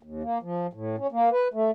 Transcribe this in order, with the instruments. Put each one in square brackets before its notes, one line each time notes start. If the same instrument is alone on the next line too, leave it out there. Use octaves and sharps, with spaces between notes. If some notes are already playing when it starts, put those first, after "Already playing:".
[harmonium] D#2
A#3
F3
A2
C#4
A#3
B4
A3